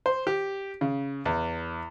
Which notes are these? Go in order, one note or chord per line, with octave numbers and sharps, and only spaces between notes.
C5
G4
C#3
E2